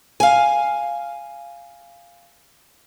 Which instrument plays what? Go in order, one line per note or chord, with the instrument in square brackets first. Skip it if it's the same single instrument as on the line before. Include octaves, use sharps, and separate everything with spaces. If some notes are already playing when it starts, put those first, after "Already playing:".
[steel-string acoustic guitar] F5 G#5